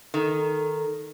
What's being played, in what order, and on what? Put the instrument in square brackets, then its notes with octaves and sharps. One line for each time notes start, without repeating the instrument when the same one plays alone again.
[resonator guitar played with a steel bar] D#3 [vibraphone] A4